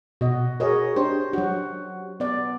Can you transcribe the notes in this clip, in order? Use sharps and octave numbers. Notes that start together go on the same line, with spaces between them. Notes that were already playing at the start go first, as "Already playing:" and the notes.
B2 F#4 D#5
F#4 G#4 A#4 C#5 D#5
D4 G4 C5
F#3 F#4
B3 D5